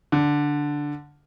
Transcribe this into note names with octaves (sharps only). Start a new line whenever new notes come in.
D3